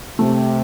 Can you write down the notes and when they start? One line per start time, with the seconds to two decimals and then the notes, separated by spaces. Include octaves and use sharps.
0.19 C3 A3